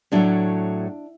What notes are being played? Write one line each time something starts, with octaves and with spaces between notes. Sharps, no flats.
A2 F#3 A3 D4